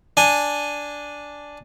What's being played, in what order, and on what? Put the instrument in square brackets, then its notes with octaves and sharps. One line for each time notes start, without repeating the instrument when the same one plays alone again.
[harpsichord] D4 G#5